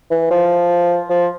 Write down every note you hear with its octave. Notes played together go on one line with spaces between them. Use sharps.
E3
F3
F3